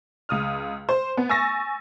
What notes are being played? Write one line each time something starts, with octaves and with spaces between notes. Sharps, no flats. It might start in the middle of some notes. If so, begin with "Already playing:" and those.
C#2 D#6 F6
C5
B3
G#5 C#6 E6 A6 A#6